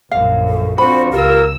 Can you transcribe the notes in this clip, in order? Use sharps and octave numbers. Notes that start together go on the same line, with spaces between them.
A#1 F#2 F5
A4
D3 F3 C4 F#4 C5 B5
C#2 A#3 F4 G4 A#4 E6